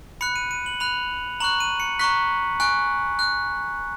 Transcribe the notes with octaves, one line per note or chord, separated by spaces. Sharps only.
B5 F#6 C#7
D#7
D#7
F#7
B5 F#6 F7
A#5 C#6 F#6 F#7
D#7
C#7
A#5 C#6 F#6 B6
G#5 C#6 F#6
F#6